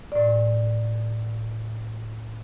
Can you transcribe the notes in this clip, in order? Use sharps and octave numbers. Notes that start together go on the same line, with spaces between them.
A2 D5